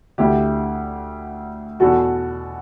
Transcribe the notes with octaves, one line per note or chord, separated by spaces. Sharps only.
D2 D3 E4 G4
E2 B2 F#4 A4